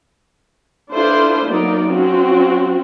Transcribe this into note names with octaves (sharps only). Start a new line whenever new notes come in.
D4 E4 F4 A4 B4 C5
F#3 A#3 B3 D#4 D5
F#3 C4 C#4 F4 F#4